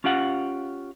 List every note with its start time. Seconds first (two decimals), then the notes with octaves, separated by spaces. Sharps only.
0.04 C#4 F4 G4 F5 F#5